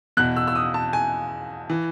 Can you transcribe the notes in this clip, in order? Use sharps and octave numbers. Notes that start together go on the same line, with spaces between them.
E2 B2 F#6
E6
E6
D#6
A5
G#5
E3